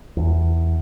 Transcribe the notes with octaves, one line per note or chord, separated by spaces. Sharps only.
E2